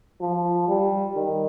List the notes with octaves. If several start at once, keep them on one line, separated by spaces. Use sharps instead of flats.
F3
G3
D#3